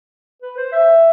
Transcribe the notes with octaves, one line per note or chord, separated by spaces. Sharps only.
B4
C5
E5